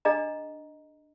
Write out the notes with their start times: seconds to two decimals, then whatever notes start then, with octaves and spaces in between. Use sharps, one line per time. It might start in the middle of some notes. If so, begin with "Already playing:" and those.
0.05 D4 G#4 D#5 A#5